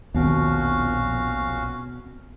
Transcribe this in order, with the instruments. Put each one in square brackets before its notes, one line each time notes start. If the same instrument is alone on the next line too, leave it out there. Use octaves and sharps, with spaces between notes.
[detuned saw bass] A#1 [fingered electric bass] D#2 [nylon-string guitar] B2 C4 [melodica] C#4 F#4 F5